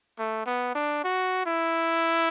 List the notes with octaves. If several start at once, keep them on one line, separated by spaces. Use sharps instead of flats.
A3
B3
D4
F#4
E4